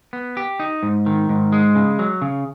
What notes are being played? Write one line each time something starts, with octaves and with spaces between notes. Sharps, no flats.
B3
G4
D#4
G#2
D#3
G#2
G#3
C#3
F#3
C#3